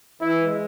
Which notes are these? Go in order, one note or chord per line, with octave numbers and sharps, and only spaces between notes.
E3 E4
G#3